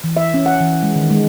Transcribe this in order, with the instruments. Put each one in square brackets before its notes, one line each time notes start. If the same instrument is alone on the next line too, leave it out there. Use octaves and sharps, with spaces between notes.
[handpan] E3
E5
C#4
F#5
E3
G#3
D#3
G#3